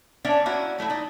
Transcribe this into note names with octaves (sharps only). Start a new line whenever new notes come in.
C#4 D4 D5 E5
A#3 C#4 E4 F#4
F#3 A3 D4 E4
D#4 D5